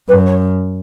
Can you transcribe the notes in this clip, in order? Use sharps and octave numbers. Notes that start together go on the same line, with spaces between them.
F#2 B4
C#5